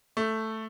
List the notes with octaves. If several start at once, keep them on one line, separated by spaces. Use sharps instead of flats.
A3